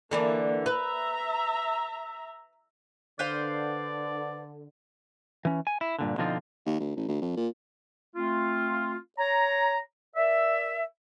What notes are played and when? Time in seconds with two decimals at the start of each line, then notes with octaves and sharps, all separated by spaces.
0.11 D3 E3 A#3 D4
0.66 B4 E5 A#5
3.19 D3 B4 C5 D5 F5
5.45 E3 C#4
5.67 G#5
5.81 E4
5.99 G2 A#2 D3
6.18 B2 D3 F3 C4 D#4 F4
6.66 D#2
6.80 D2
6.96 A1
7.08 D2
7.22 F2
7.36 A#2
8.15 A3 C4 F4
9.19 C#5 A#5
10.16 A#4 D5 E5